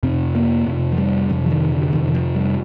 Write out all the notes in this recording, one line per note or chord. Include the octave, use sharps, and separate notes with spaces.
F2 C3 C4
A#3
F2 C3
F3
G3
F2 C3 F3
F3
D#3
D3
F2 C3 D#3
D#3
F3
G3